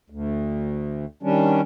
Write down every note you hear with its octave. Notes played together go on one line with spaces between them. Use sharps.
D2
D#3 G3 C#4 D4